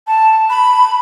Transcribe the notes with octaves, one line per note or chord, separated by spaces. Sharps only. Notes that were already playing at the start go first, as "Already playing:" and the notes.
A5
B5